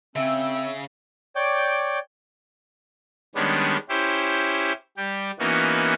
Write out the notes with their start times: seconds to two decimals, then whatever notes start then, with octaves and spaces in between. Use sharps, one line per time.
0.16 C#3 C4 E5 E6
1.36 C#5 D5 G5 D6 G6
3.35 D#3 G3 G#3 B3 C#4 D4
3.89 C#4 E4 G4 C5
4.97 G3 G4
5.39 E3 A#3 B3 C#4 D#4 F#4